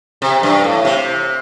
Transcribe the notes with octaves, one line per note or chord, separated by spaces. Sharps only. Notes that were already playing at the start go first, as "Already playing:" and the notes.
C3
G2
A2
C3